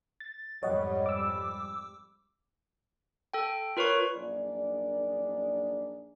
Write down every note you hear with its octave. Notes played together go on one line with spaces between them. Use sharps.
A6
F2 G#2 G3 C#5 D#5 F#5
D6 E6
A4 G5
F4 A#4 B4 C#5 C#6
A#1 F#2 D4 D#4 G#4 D5